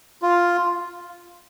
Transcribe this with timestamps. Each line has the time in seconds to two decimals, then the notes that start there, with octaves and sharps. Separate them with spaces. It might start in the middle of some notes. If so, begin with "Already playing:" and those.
0.22 F4